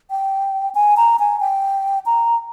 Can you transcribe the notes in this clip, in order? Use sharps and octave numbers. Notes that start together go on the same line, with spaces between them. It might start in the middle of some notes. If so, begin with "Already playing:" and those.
G5
G#5
A#5
G#5
G5
A#5